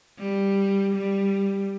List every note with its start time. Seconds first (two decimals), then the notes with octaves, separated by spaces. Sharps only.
0.18 G3
0.93 G3